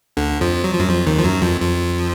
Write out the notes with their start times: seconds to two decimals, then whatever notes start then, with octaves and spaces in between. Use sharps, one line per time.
0.17 D2 D3
0.41 F2 F3
0.64 F#3
0.73 F3
0.80 F#2 F#3
0.88 F2 F3
1.06 D#2 D#3
1.18 F3
1.24 F#2 F#3
1.42 F2 F3
1.61 F2 F3